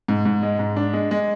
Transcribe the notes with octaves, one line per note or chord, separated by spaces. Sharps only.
G#2
G#2
G#3
G#2
D4
G#3
G#3